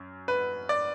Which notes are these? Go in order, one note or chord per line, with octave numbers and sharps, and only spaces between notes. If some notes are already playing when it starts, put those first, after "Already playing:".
Already playing: F#2
B4
D5